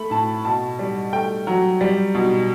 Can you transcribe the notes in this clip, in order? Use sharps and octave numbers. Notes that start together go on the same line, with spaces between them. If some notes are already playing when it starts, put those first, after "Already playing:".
Already playing: A3 B5
A2 A5
B2 A5
G3
A3 G5
F#3
G3
B2